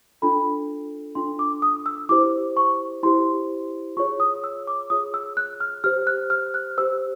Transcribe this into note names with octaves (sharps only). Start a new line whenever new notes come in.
D4 F4 A4 B5
D4 F4 A4 C6
D6
D#6
E6
E4 G4 C5 D6
C#6
E4 G4 C5 C6
F4 G#4 C#5 C#6
D#6
E6
D6
F4 G#4 C#5 D#6
E6
F#6
F6
G4 C5 F6
F#6
F6
F#6
G4 C5 E6